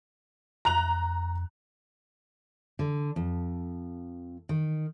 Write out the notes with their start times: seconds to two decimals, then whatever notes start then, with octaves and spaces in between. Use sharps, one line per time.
0.65 F2 A#5 F#6 F7
2.79 D3
3.16 F2
4.49 D#3